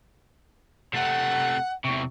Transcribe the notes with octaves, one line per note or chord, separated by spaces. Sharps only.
C3 A3 F#5
E2 C3 C#6